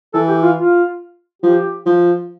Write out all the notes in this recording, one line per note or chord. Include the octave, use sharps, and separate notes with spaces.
E3 A4
G4
F4
F4
F3 G4
F3